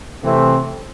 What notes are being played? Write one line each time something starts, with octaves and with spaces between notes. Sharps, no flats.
C3 E3 A3 C4